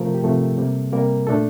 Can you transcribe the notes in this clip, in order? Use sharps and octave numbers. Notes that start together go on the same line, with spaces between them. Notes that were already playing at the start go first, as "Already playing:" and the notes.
Already playing: C3 F3 A3 A#4
G4
C3 F3 A3 A4
C3 G3 A#3
C3 G3 A#3 A#4
A#2 A3 D4 A4